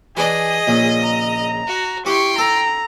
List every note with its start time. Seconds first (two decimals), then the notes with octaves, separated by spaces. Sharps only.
0.17 E3 D4 G#4 D#5
0.68 A#1 C#3
1.02 A#5
1.67 F#4
2.06 E4 G4 G5 C6 C#6
2.38 A4 A#5